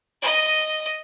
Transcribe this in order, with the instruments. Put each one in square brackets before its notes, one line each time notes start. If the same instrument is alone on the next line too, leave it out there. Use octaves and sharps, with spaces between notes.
[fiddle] D#5